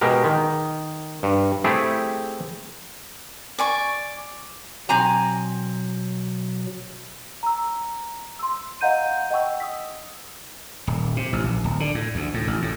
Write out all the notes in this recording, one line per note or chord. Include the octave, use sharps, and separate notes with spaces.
B2 G#3 G4 A#4
D#3
G2
A3 C4 E4 G4 G#4
D5 G#5 C#6
B2 F#3 C4 G#5 A#5
A#5 E6
C6 E6
D#5 F5 F#5 A#5 G6 D#7
D#5 F#5 G5 C#6 E6
D#6 E6 B6
D#1
C3
A1
A#1
D1
D3
A2
D2
A2
A1
A2